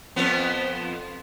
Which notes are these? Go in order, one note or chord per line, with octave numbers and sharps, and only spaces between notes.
F2 F3 B3